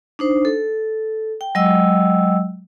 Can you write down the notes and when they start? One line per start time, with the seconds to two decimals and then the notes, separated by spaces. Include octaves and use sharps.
0.19 D4 D#4 C5
0.45 A4
1.41 G5
1.55 F#3 G#3 D#5 G5 E6